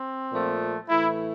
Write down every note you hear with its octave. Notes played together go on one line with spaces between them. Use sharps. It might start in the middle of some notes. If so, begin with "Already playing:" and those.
Already playing: C4
A#2 F3 A3
A2 E3 A3 E4